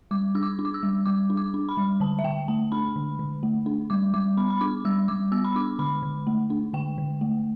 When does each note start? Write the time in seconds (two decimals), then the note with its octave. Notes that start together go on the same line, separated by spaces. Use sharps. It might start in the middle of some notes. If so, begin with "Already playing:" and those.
0.11 G3 D6
0.35 D4 E6
0.43 D6
0.59 D4
0.65 D6
0.74 E6
0.83 G3
1.06 G3 D6
1.30 D4
1.37 D6
1.54 D4
1.69 B5
1.77 G3
2.00 D3 A5
2.19 E5
2.24 D3 G5
2.48 A3 A5
2.72 D4 B5
2.96 D3
3.19 D3
3.43 A3
3.66 D4
3.90 G3 D6
4.14 G3 D6
4.37 B3 B5
4.50 B5
4.61 D4 D6
4.85 G3 E6
5.08 G3 D6
5.32 B3 E6
5.45 B5
5.56 D4 D6
5.79 D3 B5
6.03 D3
6.27 A3
6.50 D4
6.73 D3 G5
6.98 D3
7.21 A3